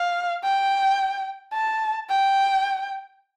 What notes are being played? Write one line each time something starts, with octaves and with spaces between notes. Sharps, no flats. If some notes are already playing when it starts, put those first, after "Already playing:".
Already playing: F5
G5
A5
G5